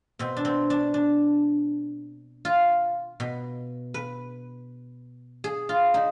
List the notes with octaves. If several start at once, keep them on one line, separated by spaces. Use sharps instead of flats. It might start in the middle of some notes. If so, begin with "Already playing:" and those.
B2 C4
D4
C4
D4
D4
F4
B2
B4
G#4
F4
D#4